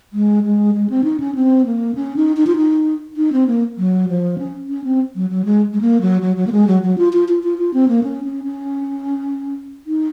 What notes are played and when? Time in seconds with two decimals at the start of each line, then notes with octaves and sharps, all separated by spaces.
0.13 G#3
0.44 G#3
0.75 G#3
0.90 C4
1.04 D#4
1.20 C#4
1.35 C4
1.66 A#3
1.95 C#4
2.16 D#4
2.37 D#4
2.47 F4
2.56 D#4
3.17 D#4
3.33 C4
3.47 A#3
3.78 F#3
4.09 F3
4.38 C#4
4.69 C#4
4.84 C4
5.16 F#3
5.30 F#3
5.45 G#3
5.73 G#3
5.81 A#3
6.01 F#3
6.22 F#3
6.37 F#3
6.47 A#3
6.52 G#3
6.67 F#3
6.83 F#3
6.98 F4
7.13 F4
7.28 F4
7.43 F4
7.58 F4
7.74 C4
7.88 A#3
8.03 C#4
8.24 C#4
8.44 C#4
9.87 D#4